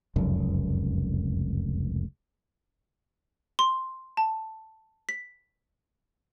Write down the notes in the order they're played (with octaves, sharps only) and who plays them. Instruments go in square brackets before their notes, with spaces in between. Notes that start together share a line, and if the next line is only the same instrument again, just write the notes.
[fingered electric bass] F1 C#2 F#2
[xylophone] C6
A5
B6